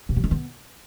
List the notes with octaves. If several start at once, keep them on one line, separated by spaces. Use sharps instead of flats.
B2
F3
D#3
B3